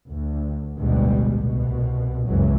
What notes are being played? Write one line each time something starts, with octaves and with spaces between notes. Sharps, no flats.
D2
A1 D2 B2 G3 G#3
C2 B2
F#1 C#2 G#2 E3 F#3 G#3